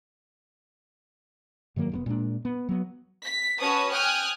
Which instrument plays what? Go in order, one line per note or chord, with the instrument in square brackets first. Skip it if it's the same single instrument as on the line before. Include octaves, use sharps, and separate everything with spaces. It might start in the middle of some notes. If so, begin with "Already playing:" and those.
[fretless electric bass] G#2 D#3 F#3 A#3
F1 C3 B3
A#2 G#3 B3 D4
B3
F#3 B3
[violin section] B6
C#4 F#4 B4 C#5 A5 D#6
G5 G#5 D#6 F6 F#6